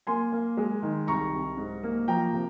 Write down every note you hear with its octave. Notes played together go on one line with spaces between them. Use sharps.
A#3 G#5 C6
A#3
G#3
D#3
C2 A#5 C#6
C2
G#2
A#3
F3 G5 A#5
C3